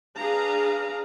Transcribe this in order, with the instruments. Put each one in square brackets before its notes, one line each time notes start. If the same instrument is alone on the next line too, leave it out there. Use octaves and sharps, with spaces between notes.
[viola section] D4 G#4 B4 F5 A#5